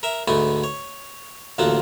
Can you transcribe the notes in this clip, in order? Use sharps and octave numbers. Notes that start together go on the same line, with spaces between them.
A#4 E5
D2 G#2 A3 B3 G#5
C#5
A1 D2 F3 A#3 A4 F#5